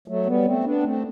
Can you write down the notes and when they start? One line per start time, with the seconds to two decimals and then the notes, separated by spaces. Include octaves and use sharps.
0.08 F#3 A3
0.26 G3 B3
0.45 A3 C4
0.64 B3 D4
0.83 A3 C4